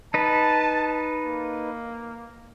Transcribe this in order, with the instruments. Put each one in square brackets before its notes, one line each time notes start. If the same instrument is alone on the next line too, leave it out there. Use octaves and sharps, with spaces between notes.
[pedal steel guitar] D#4 B4 [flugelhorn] A5
[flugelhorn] A#3